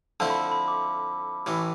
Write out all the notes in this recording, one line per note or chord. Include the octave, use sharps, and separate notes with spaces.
F2 D3 F3 A3 E4 A5
B5
A5
B5
D6
A1 A2 E3